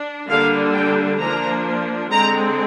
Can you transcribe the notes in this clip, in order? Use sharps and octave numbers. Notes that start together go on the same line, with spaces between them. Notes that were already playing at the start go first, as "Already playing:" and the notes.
Already playing: D4
D3 G3 A#3 D4 F5
G5
F3 A#3 D4 A#5
D3 G#3 C4 A#5